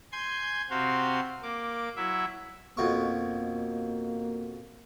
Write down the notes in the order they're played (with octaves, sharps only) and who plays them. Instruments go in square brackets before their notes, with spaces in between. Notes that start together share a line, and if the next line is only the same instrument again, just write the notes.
[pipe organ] G#5 C6 G6 G#6
C3 C4 F#4 F5 C6
A#3 D6
F#3 E4 E5
[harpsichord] F2 B2 C#6 [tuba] A#3